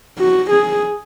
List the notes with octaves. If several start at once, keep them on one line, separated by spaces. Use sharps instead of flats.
F#4
G#4